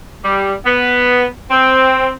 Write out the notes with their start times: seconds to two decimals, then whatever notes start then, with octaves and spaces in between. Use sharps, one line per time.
0.24 G3
0.66 B3
1.51 C4